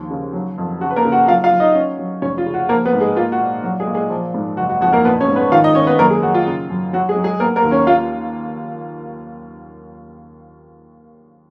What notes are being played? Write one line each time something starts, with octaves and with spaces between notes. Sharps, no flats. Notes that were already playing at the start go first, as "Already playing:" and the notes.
Already playing: D#2 F3
C#3
F#3
F2
C#3 F#4
B4
A#3 A#4
C#3
F#4 F#5
F#3 F4 F5
F4 F5
F#3
D#4 D#5
C#4
F#3
F1 C#4 C#5
F4
C#3
F#4
F3 A#3 A#4
B3 B4
G#2
G#3 G#4
A#3 F4
F#4
A#2
F#3 F#4
G#3 G#4
A#2
G#3 G#4
F3
G#2
F#1 F#4
F#4
F2 F#4
A#3 A#4
A#1 B3 B4
C#4 C#5
G#2
B3 B4
D#3 F4 F5
D#4 D#5
D#3 C#4 C#5
B3 B4
F#2 A#3 A#4
G#3 G#4
F#3 F#4
F4
C#3
F#2
F#3 F#4
G#3 G#4
F#3
G#3 G#4
A#3 B3 A#4
A#3 A#4
D#2
C#4 C#5
A#3 F4 F5